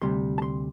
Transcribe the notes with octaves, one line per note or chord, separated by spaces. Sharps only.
D2 C3 G3 C6
A5
C6